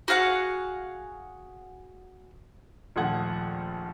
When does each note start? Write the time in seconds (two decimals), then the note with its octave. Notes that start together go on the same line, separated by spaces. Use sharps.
0.08 F#4 G#4 F5 F#5
2.96 A#1 D#2 F3 A3 F#5 G#6